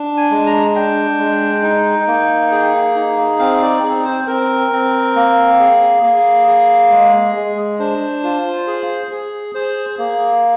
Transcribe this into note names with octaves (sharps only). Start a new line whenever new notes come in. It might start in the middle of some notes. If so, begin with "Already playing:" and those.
Already playing: D4
G#5
G#3
A#5
D4 G5
G#3
D#4
A#3
G#4
D#4
C4 F5
D5
C4 G#4
C5
C4 A#4
C4
A#3
G#4
A#3 G#4
G#4
G#3
G#3
D4 C5
F4
G#4
G#4
G#4 C5
A#3 G#4